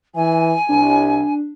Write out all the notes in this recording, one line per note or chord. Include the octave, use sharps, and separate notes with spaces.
E3 G#5
C2 D4